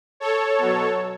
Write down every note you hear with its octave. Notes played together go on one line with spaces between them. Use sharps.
A4 C#5
B2 F#3